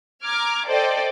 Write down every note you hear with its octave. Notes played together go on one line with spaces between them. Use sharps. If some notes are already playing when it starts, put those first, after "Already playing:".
A#5 D6 F6 G#6
A4 C5 D5 D#5 G5